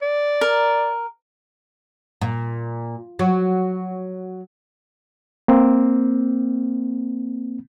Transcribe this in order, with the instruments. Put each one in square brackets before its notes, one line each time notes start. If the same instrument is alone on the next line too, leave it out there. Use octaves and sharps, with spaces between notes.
[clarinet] D5
[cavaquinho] A#4
[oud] A#2
F#3
[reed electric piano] A#3 C4